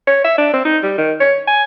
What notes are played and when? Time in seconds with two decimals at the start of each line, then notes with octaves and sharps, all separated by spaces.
0.07 C#5
0.24 E5
0.38 D4
0.53 C4
0.65 D#4
0.83 G3
0.98 D#3
1.20 C#5
1.47 G#5